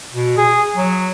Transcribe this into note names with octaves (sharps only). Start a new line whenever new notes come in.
B2
G#4
F#3